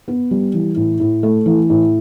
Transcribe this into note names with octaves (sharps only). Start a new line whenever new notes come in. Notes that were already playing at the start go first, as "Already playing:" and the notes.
B3
G3
E3
A2
A2
A3
E3
A2